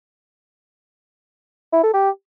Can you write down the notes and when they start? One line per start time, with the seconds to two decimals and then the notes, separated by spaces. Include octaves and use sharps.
1.73 E4
1.83 A4
1.94 G4